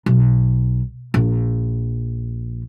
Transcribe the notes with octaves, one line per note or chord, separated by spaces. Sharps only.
B1
A#1